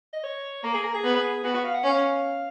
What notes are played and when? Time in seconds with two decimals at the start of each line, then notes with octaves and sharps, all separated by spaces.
0.13 D#5
0.23 C#5
0.63 A#3 A#4
0.74 G#4
0.84 A#4
0.94 G#4
1.04 B3
1.44 B3 F#4
1.54 F#4
1.64 F5
1.74 F#5
1.84 C#4 F5